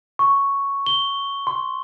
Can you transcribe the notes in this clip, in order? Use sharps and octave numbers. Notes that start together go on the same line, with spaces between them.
C#6
G7
C6